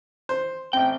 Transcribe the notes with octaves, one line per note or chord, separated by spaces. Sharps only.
C5
A1 C4 G5